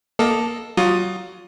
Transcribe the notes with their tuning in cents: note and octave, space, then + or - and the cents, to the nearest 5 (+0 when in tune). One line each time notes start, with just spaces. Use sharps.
A#3 +20 A4 +0 D#5 +0
F#3 +35 F4 +25 D#6 +0